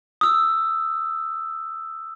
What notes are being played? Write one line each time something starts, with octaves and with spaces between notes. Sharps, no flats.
D#6 E6